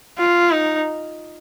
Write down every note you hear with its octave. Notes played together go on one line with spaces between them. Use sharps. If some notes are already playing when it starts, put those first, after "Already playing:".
F4
D#4